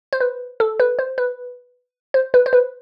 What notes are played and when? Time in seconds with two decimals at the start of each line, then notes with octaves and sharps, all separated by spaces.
0.13 C5
0.21 B4
0.60 A4
0.80 B4
0.99 C5
1.18 B4
2.14 C5
2.34 B4
2.46 C5
2.53 B4